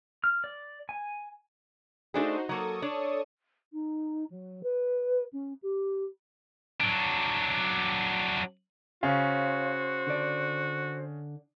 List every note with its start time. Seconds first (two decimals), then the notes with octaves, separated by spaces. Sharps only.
0.24 F6
0.44 D5
0.89 G#5
2.14 A3 D4 D#4 F#4 G#4 C5
2.49 F#3 A#3 A4 C#6 D#6
2.82 D4 C#5
3.73 D#4
4.30 F#3
4.63 B4
5.33 C#4
5.63 G4
6.81 F#3 D4
9.03 C#3 F#4 C5 C#5 F5
10.07 D3 D5